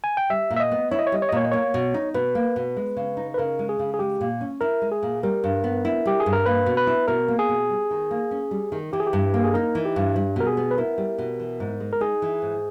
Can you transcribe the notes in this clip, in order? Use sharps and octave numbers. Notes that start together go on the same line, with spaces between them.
G#5
G5
G3 E5
A#2
E5
D#5
B3
E4 C#5
D#5
C#5
G3 D#5
C#5
D#5
A#2 C#5
D#5
A#3 C#5
B2
D#4
B2 B4
A#3
B2
G#3
C#3
D#4
B4
C#3 A#4
G#3
G#4
C#3
G#4
G#3 G4
A#2
C#4
E4 A#4
G#3
G#4
A#2
G3 A#4
G2
B3
E4
G3 G4
G#4
G2
A#4
A#3 B4
B2
B4
E4
B2 A#4
A#3
G#4
B2
G3
D#3
A#3
C#4
G3
D#3
E3 G4
G#4
G4
G2
A#3
G#4
D#4 A#4
E3
G4
G2
G3
B2 A#4
G#4
B3
B4
E4 A#4
G3
B2
E3
G#2
G#3
A#4
D#4 G#4
E3
G#2